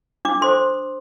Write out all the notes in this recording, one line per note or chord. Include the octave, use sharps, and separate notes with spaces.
D4 D6
A4 C5 C6